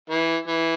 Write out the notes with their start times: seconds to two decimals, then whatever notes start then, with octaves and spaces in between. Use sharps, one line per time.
0.10 E3
0.47 E3